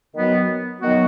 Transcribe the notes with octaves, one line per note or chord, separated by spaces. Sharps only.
D#3 F#3 B3 F#4
D#3 F#3 B3 F#4